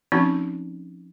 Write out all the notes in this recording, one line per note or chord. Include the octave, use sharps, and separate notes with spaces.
F3 C4 C#4 D#4 F#4